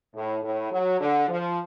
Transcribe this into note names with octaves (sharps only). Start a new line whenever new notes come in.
A2
A2
F#3
D3
F3